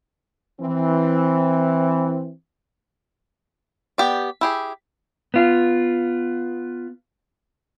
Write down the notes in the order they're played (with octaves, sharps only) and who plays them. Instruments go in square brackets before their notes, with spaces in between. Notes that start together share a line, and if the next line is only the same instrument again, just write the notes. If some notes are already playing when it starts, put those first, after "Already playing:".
[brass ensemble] E3 C4
[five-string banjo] B3 G4 D5
E4 G4 G#4
[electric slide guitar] B3 F4